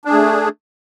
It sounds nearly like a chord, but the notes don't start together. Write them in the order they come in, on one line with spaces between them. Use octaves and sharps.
D4 G#4 A3